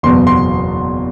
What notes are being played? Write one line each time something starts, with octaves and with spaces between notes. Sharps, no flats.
F#1 E2 B2 C6
C6